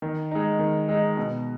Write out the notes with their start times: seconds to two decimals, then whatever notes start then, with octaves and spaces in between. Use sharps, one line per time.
0.02 D#3
0.31 G#3 D#4
0.59 D#3
0.89 G#3 D#4
1.17 B2